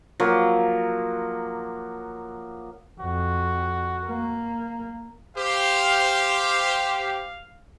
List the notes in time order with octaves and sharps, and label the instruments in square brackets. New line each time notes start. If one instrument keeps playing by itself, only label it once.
[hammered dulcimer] F3 F#3 A#3
[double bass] F2 [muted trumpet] F#4
[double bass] A#3
[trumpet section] G4 C5 [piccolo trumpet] F5